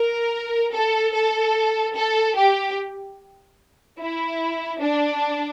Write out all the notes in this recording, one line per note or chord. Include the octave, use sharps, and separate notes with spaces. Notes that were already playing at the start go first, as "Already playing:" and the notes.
Already playing: A#4
A4
A4
A4
G4
E4
D4